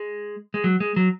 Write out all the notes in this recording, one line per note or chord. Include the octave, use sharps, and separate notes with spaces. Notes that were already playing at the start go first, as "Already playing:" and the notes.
Already playing: G#3
G#3
F#3
G#3
F#3